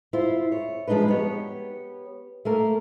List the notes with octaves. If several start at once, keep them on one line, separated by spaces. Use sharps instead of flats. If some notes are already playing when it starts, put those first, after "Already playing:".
E4 F4 C5
C#5
F3 G#3 A#3 D4 D#4 B4
B3 G4 C#5
A3 A#3 A#4